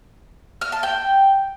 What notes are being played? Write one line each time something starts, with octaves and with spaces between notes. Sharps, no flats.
F6
A5
G5